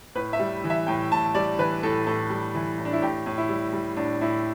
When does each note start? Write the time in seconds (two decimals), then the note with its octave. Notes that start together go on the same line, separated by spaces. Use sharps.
0.15 A2 B4
0.33 E5
0.39 G3
0.64 E3
0.70 E5
0.87 A2 G5
1.11 A2 A5
1.35 G3 D5
1.58 E3 B4
1.83 A2 A4
2.07 A2 A4
2.30 G3
2.54 E3
2.78 A2
2.85 D4
2.93 E4
3.02 A2 G4
3.26 A2
3.38 E4
3.49 G3
3.73 G3
3.97 A2 D4
4.21 A2 E4